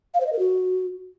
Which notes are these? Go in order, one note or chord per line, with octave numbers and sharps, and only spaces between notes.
F5
C5
D#5
A#4
F#4